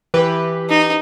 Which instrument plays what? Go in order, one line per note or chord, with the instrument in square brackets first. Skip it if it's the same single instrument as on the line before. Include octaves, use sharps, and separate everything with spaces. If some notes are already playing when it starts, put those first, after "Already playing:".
[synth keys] E3 G4 B4
[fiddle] D#4